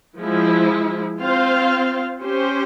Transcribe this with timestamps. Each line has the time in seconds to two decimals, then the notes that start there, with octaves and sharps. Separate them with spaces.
0.18 F3 G#3 E4
1.20 C4 F4 C5 F5
2.20 C#4 G4 C5